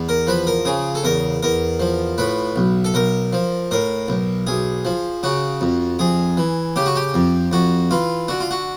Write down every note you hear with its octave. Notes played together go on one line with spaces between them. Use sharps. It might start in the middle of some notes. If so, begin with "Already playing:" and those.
Already playing: E2
A#4
F3 B4
A#4
C#3 G#4
A4
E2 A#4
E2 A#4
F3
A2 B4
B1
A4
B1 A#4
F3
A2 A#4
B1
B1 G#4
F3
C#3 F#4
F2
F2 G#4
E3
C#3 G4
F#4
G4
F2
F2 F#4
E3 F4
D3 F#4
F4
F#4